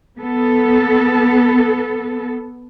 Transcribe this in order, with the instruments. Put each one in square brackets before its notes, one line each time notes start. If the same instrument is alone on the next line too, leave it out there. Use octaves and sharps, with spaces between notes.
[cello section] B3 A4